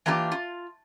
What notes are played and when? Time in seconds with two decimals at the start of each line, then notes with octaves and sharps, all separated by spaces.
0.06 E3 A#3 D4 F4 G4
0.32 F4